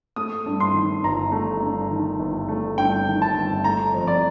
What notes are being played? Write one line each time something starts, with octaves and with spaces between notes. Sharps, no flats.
A3 D#6
G2
C6
D#3
G1 A#5
A3
G2
D#3
G1
A3
G2 G5
D#3
A5
G1
A3 A#5
F2
D5